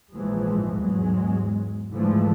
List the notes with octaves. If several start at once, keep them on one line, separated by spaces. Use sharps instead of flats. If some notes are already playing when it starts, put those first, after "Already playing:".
A#1 G#2 E3 F3 G#3
E2 G#2 F#3 G#3
G#2 D3 E3 F3 G#3 A3